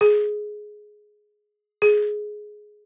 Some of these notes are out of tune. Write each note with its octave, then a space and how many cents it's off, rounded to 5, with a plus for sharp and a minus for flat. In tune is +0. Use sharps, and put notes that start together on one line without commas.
G#4 +10
G#4 +10